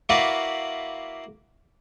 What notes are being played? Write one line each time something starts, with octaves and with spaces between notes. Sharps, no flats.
A#3 E4 F#4 B4 D5 F5